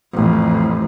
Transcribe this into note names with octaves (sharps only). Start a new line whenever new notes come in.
A1 F2